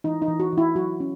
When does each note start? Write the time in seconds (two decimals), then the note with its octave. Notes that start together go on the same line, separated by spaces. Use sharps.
0.04 E3 D#4
0.22 D#4
0.28 E3
0.40 F#4
0.53 E3 E4
0.76 F#3 F#4
1.00 C#4